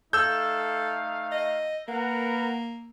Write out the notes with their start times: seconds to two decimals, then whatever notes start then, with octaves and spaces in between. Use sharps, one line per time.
0.13 A3 D#4 A4 F5 E6 G6
1.32 D#5
1.88 A#3 A#4 B4 F#5